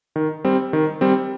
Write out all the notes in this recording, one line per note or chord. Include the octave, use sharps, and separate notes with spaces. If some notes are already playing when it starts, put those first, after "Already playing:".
D#3
G3 C4
D#3
G3 C4